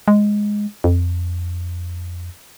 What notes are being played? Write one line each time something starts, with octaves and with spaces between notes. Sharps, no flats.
G#3
F2